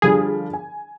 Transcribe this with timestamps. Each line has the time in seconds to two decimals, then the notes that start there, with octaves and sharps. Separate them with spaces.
0.02 D3 F3 G3 G#4
0.53 G#5